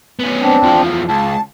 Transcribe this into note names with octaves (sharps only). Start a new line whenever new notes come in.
B3 C#4
C4 D4
E2 F3
C#2 A5